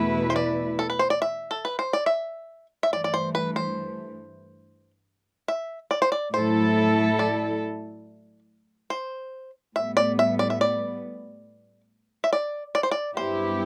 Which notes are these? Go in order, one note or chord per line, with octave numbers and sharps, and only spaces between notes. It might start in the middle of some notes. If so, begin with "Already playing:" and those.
Already playing: E2 B2 A3 E4 B4
C5
D5
A4
B4
C5
D5
E5
A4
B4
C5
D5
E5
E5
G2 E3 A3 D5
D5
C5
B4
C5
E5
D5
C5
D5
A2 F#3 A3 E4 A4 C5
D5
C5
A2 G3 B3 E5
D5
E5
D5
E5
D5
E5
D5
D5
C5
D5
G2 F#3 B3 E4 G4 C5